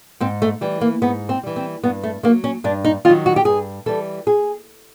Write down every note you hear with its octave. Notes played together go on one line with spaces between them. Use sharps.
G#2 C4
A3
E3 G3
A#3
G#2 B3
C4
E3 G3
C4
G2 B3
A3
D#3 A#3
F#3
C#4
G2 D4
D#4
D#3 F#3 F4
F#4
G4
G2 G#4
E3 G3 A4
G#4